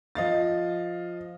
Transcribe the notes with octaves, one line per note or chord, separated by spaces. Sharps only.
F3 D#5 F5 A6